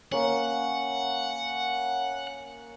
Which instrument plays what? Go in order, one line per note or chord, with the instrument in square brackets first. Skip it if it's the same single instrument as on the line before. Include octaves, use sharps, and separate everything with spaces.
[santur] A#3 C#4 [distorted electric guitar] F#5